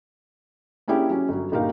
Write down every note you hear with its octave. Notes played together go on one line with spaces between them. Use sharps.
A#3 C#4 D4 E4 G4 G#4
F#3 C#4
G1 F#3
G1 A#2 D#4 G4 A#4 F5